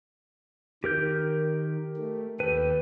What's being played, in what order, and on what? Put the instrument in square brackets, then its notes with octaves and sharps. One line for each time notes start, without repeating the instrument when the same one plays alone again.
[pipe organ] D#3 [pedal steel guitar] G4 A#4 G6
[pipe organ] A3
[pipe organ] D#2 G4 A4 [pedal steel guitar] B4